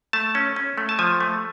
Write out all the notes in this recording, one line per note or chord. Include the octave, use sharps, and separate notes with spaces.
A3 A5
C#4
C#4
A3
A5
F3 G#5
A3